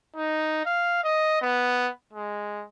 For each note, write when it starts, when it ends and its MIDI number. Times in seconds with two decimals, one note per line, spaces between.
0.16 0.64 63
0.66 1.02 77
1.04 1.39 75
1.42 1.89 59
2.13 2.65 56